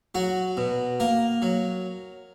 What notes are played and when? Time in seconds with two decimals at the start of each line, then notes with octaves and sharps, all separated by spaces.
0.15 F#3 F#4
0.57 B2
1.00 A#3 A#4
1.42 F#3